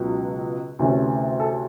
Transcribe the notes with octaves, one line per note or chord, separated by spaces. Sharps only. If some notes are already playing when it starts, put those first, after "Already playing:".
Already playing: C#2 B2 F#3
D2 C3 E3 A3 C#4
A4